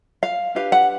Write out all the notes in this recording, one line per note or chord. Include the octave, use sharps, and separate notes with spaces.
F5
D4 G4 B4 F5
F#5